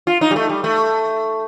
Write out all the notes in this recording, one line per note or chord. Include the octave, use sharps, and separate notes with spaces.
F4
D#4
G3
A3
G3
A3